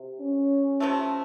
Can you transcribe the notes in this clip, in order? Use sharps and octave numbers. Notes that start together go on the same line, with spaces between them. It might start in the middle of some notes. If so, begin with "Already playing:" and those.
Already playing: C3
C#4
C3 F3 A3